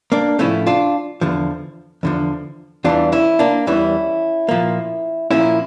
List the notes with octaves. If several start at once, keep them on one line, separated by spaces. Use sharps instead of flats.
A#3 D4
A2 F3 A3 C#4 E4
D4 F4
E2 D3 F3
E2 D3 F3
E2 E3 G3 D4 F4
C#4 E4
A#3 D4
E2 E3 G3 C#4 E4
A#2 F3 A#3
A#2 F3 A#3 C#4 E4